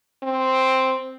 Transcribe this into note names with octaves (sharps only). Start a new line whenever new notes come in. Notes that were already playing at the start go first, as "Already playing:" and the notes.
C4